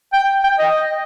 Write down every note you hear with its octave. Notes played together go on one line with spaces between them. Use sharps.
G5
G5
D#5